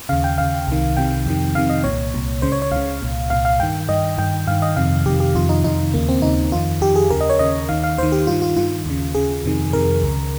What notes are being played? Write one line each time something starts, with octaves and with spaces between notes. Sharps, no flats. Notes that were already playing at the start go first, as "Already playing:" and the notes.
D#2 C#3 F5
G5
D#2 C#3 F5
C2 C3 D#3
C2 C3 D#3 G5
F2 C3 D#3
F2 C3 D#3 F5
D#5
C2 A#2 C#5
C2 A#2
C#2 C#3 C5
C#5
C#5
C#2 C#3 F5
C2 A#2
C2 A#2 F5
F5
G2 D#3 G5
G2 D#3 D#5
G2 D#3 G5
G2 D#3 F5
D#5
F2 C3 D#3 F5
F2 C3 D#3 G4
G4
F2 C3 D#3 F4
D#4
F2 C3 D#3 D#4
D#2 C#3 A#3
C4
D#2 C#3 D#4
F2 D#3 F4
F2 D#3 G4
G#4
D#2 C#3 A#4
D#5
C#5
D#2 C#3 D#5
D#2 D#3 F5
F5
D#2 D#3 C5
G4
G2 D#3 F4
F4
G2 D#3 F4
D#2 C#3
D#2 C#3 G#4
F2 C3 D#3
F2 C3 D#3 A#4
C#2 C#3